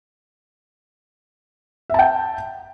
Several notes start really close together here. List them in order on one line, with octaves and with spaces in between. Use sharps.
E5 A5 G5